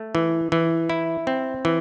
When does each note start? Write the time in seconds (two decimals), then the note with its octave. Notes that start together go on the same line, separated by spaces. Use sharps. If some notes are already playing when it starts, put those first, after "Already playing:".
Already playing: A3
0.15 E3
0.52 E3
0.90 E4
1.27 C4
1.65 E3